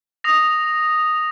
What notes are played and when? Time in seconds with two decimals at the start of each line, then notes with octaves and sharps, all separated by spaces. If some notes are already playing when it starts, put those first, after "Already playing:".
0.24 D#6 A#6 F7